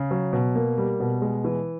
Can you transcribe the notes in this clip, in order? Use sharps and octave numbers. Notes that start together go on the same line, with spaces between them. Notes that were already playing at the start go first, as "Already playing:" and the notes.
Already playing: C#3
F#3
B2
A#3
G3
B2
G#3
E3